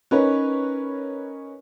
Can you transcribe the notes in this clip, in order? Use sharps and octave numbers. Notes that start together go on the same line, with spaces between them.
C#4 D#4 A#4 B4 C#5